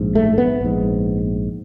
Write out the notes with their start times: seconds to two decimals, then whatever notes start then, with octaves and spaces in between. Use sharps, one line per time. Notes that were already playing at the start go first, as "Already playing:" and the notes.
Already playing: A#1 G#2
0.15 A3
0.38 B3
0.61 A#1 G#2